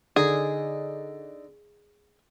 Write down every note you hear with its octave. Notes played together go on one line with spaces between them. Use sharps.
D3 D#4 G#4